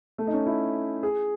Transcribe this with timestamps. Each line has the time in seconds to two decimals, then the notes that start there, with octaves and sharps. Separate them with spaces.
0.18 A3
0.27 D#4
0.33 C#4
0.46 E4
1.03 G#4